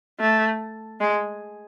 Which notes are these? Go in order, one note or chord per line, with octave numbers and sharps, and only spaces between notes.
A3
G#3